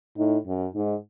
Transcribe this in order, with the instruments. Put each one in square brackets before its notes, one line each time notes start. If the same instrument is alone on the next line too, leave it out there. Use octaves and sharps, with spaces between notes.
[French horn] A2 [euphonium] D#4
[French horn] F#2
[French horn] G#2 [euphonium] D#4